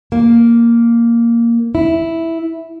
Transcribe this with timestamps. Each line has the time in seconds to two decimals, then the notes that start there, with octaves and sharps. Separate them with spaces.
0.12 A#3
1.75 E4